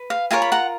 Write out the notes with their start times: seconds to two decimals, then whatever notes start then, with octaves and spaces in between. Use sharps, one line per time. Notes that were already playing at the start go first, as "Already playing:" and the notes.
Already playing: B4
0.10 F5
0.31 F4 A#4 C#5 F5 G#5
0.42 B5
0.52 F#5 A#5